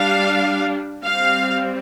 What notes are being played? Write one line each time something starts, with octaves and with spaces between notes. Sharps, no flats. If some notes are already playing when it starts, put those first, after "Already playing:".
Already playing: G3 D4 F5
G3 C4 F5